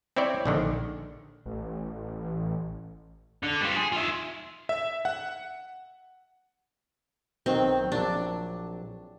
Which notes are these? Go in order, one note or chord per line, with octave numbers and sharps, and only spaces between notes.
C4 E4 C#5 D5
A#1 D3 D#3
A1
D3
G3 F4
G#4
F4 E5
E5
F#5
B1 D#3 F#3 C4
A#1 F#3 D4